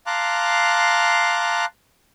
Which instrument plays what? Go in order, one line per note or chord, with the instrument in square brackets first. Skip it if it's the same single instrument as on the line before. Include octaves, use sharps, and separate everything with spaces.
[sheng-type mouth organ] F5 A5 A#5 C6 D6 F#6